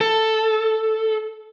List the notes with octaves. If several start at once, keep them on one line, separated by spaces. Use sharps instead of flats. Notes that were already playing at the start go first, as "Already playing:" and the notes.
A4